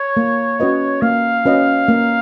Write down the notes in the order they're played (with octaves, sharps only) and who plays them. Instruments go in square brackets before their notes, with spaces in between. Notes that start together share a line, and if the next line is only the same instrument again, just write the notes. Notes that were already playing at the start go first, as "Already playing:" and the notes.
Already playing: [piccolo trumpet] C#5
[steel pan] A#3
C#4 F#4 B4 D#5
[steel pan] A#3 [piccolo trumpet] F5
[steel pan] C#4 F#4 B4 D#5
A#3